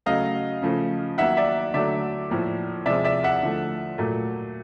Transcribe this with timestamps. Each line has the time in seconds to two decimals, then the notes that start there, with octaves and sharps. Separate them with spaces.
0.06 C#3 F#3 A3 D#5 F5
0.62 C#3 F3 A3
1.18 D#3 F#3 A#3 E5 F#5
1.37 D5 E5
1.74 D3 F#3 A3 D5 E5
2.30 A2 F3 A#3
2.86 C3 F3 G#3 D5 E5
3.05 D5 E5
3.24 E5 F#5
3.43 D3 F3 A3
3.98 A#2 F#3 A3